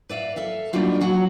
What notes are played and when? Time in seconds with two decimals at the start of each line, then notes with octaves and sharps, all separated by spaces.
0.09 B4 D5 E5 F5
0.36 A4 E5 F5
0.73 G3 A#3 D4 D#4 F4 F#4
1.01 F#3 F#4 F#5